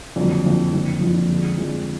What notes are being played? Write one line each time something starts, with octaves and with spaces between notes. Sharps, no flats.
F#1 F2 D3 F#3
F#1 F2 D3 F#3
F#1 F2 D3 F3
F#1 F2 D3 F3
F2 D3 G#3
F2 D3 G#3